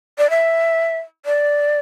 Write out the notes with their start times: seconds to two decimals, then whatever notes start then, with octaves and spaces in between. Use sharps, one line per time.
0.18 D5
0.30 E5
1.26 D5